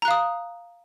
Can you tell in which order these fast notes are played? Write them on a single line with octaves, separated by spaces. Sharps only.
A#5 F#6 F5 D#6